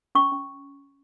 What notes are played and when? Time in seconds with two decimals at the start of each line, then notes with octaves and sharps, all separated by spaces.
0.15 C#4 C#6
0.32 C#4